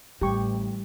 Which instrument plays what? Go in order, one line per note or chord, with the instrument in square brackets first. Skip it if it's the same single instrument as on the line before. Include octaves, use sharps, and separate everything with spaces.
[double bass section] A1 [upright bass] G3 [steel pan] G4 C#6